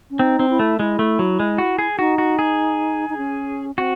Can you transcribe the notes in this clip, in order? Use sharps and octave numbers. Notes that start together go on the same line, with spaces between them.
C#4
C4 D#4
C4
E4
A3
G#3 E4
A3
F#3
G#3
F#4
G#4
D#4 F#4
F#4
G#4
D#4
C#4
C4 F#4